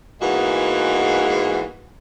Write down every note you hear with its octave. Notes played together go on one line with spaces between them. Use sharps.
G#2 E3 G#3 A#3 B3 F#4